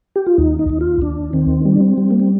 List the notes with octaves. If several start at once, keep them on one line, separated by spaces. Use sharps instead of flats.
G4
F4
D#2 D#4
D#4
D#2
F4
D#2 D4
D#3 C4
G3 C4
D4
C4
G3
A#3
C4